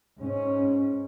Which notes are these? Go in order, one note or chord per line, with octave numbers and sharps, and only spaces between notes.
G#2 C#4